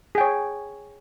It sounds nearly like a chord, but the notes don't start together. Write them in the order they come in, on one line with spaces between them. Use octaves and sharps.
G#4 G5 C#5